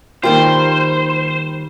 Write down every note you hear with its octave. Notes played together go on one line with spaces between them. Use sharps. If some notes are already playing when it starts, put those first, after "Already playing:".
D#3 G3 A#3 F4 C5